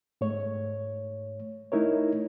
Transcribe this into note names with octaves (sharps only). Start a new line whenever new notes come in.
G#2 A3 C#5
A3 D#4 E4 A#4 C#5